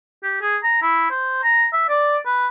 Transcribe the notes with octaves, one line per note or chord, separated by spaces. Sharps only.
G4
G#4
A#5
E4
C5
A#5
E5
D5
B4